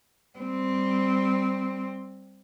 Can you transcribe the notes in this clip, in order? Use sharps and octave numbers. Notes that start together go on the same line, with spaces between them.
G3 C4